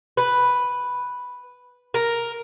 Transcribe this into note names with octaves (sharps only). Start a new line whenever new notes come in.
B4
A#4